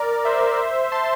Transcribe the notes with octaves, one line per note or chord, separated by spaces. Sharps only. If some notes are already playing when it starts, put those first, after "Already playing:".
Already playing: A#4 D5
C5 E5
A5 C6